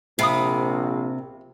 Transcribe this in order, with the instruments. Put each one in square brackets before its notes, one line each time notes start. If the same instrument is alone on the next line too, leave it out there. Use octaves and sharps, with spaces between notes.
[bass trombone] A#1 [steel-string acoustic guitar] C3 [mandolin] F5 B5 D#6